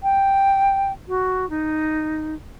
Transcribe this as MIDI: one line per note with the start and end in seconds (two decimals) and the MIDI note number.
0.03 0.92 79
1.08 1.49 66
1.50 2.35 63